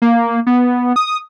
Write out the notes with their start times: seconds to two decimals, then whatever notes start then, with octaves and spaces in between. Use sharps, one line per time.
0.02 A#3
0.47 B3
0.96 D#6